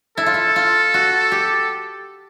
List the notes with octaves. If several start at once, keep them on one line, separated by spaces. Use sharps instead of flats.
E4 A4
F4
E4
F4
F#4
G4